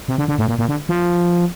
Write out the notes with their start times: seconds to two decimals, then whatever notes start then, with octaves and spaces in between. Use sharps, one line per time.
0.08 C3
0.18 D3
0.28 D3
0.38 A2
0.48 A#2
0.58 A#2
0.68 D3
0.89 F3